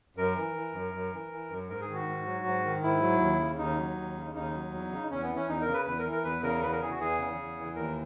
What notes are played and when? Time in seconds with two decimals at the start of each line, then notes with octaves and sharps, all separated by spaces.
0.17 F#2 A#4
0.36 E3
0.55 E3
0.74 F#2
0.93 F#2
1.12 E3
1.31 E3
1.50 F#2
1.69 G#2 A#4
1.81 G#4
1.88 D#3
1.94 F#4
2.07 G#2
2.26 F#3
2.45 G#2
2.64 D#3
2.83 G#2 E4
3.01 F#3
3.20 D#2
3.40 C#3
3.58 D#2 D#4
3.77 F#3
3.97 D#2
4.15 C#3
4.35 D#2 D#4
4.54 F#3
4.73 E2
4.91 C#3
5.11 E2 C#4
5.23 B3
5.30 E3
5.36 C#4
5.48 E2 D#4
5.62 A#4
5.67 C#3
5.74 B4
5.86 E2 B4
5.99 A#4
6.05 E3
6.12 A#4
6.24 E2 B4
6.43 C#3 A#4
6.63 E2 B4
6.72 A#4
6.82 E3 G#4
6.90 F#4
7.00 E2 G#4
7.19 C#3
7.38 E2
7.57 E3
7.76 D#2 A#4